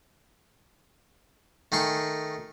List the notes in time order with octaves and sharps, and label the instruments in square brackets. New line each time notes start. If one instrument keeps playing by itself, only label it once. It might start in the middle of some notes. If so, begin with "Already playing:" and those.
[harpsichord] D#3 A3 G#5 C6 C#6